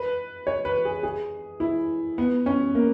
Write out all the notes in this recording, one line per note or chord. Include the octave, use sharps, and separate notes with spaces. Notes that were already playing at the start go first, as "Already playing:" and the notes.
Already playing: B4
C#5
B4
G#4
G#4
E4
B3
C#4
A#3